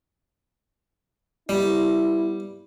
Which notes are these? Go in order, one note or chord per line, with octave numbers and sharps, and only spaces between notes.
G3 B3 E4